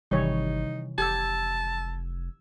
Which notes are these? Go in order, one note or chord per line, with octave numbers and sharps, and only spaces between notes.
G#1 C3 D#3 E3 G3 D#4 C#5
F1 G4 A5 E6 G#6